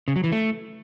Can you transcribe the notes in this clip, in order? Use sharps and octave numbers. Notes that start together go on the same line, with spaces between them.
C#3
F#3
E3
A3